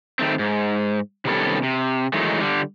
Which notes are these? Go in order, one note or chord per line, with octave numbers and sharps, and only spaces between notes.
D#3 A3 C4
G#2
C3 D#3 G3 B3 C#4 A4
C3
D#3 E3 F#3 G#3 A3 D#4
D3 G3